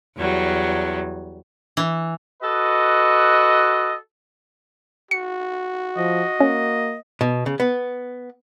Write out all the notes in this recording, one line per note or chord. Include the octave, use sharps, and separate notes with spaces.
E2 F#3 G3
E3
F#4 A4 B4 D#5
F#4 C#7
F3 D#5
A#3 C#4
B2
C#3
B3